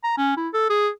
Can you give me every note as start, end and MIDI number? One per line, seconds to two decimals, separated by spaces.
0.04 0.13 82
0.18 0.37 61
0.37 0.48 64
0.54 0.68 69
0.70 0.89 68